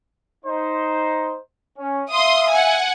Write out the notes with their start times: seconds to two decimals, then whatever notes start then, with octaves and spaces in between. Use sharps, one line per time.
0.45 D#4 C5
1.79 C#4
2.10 E5 F5 C6 D#6
2.50 F#5 G#5